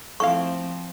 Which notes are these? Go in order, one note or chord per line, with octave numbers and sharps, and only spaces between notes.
F3 A3 C4 E4 F5 C#6